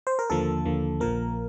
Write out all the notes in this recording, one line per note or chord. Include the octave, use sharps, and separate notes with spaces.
C5
A#4
D#2 D3 F3 A#3 A4
D#2 D3 F3 A#3
A#1 A#2 F3 A#3 A#4